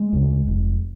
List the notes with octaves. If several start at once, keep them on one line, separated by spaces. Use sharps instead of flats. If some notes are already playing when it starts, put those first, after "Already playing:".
Already playing: G#3
D2 C#3
F1